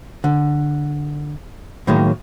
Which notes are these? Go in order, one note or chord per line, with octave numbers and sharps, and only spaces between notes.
D3
A2 D#3 F#3 G#3 A#3